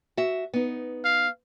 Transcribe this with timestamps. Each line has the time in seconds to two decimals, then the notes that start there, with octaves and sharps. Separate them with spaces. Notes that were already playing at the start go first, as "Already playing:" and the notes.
0.17 F#4 E5
0.54 B3 D#4
1.05 F5